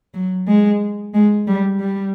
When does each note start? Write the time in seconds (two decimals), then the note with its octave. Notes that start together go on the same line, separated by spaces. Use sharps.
0.14 F#3
0.47 G#3
1.14 G#3
1.47 G3
1.80 G3